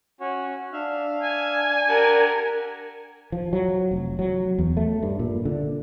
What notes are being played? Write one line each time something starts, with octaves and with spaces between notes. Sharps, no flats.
C#4 F#4 C#5
D4 E5 F5 F6
G#5
G4 A#4 F#5 A5
F3
F#3
F1
F#3
E2
A3
G2
A#2
D3